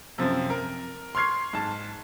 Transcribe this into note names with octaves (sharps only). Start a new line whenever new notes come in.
F#2 C3 F3 C4
A#4
C6 C#6 F6 G#6 C7
G#2 A5